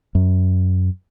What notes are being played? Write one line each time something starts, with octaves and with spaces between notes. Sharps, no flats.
F#2